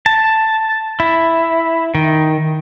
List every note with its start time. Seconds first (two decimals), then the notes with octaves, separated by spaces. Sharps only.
0.06 A5
1.00 E4
1.95 D#3